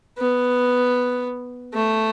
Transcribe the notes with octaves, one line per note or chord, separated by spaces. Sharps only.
B3
A3